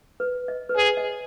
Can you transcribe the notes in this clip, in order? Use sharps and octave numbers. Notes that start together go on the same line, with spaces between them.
B4
D#5
B4
G#4 C#5
D#5